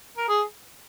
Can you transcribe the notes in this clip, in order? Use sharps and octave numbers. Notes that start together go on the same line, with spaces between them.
A#4
G#4